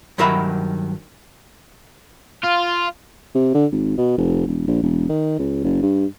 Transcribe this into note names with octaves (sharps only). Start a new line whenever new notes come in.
G2 D#3 F#3 A#4 E5 B5
F4
C3
D3
G#1
B2
F1
E1
A#1
E1
D#3
C#2
F#1
G2